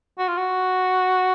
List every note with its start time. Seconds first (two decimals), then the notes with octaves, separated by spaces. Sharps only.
0.19 F#4
0.28 F4
0.38 F#4